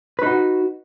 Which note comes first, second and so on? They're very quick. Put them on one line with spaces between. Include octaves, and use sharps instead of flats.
B4 D#4 F#4